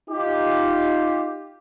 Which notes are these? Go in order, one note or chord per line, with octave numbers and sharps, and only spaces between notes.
D#4 F4 G4